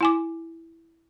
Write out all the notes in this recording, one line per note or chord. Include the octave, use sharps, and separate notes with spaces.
E4 G#5 D6